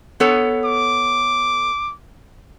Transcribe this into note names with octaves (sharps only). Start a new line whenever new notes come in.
B3 A4 C#5
D6